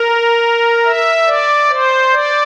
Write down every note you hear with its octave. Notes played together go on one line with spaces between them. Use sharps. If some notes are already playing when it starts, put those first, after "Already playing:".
Already playing: A#4
E5
D5
C5
D5